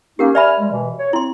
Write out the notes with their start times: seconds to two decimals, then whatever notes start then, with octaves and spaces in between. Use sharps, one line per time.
0.19 A#3 C#4 D#4 G4 A#4 F#5
0.35 D5 E5 G#5 B5 F6
0.58 G3 G#3
0.72 B2 E3
0.98 C#5
1.13 C4 E4 C6